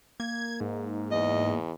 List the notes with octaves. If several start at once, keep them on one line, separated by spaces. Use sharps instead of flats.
A#3 G#6
G#2
E2 D#5